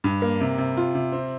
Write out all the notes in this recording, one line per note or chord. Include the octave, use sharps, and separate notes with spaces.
G2
A#3
C3
C3
F4
C3
C4